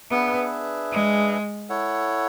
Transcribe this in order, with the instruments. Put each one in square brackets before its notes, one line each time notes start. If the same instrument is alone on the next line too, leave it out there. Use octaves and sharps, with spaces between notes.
[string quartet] B3 [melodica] D4 G#4 B4 E5
[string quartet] G#3
[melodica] E4 A4 C#5 F#5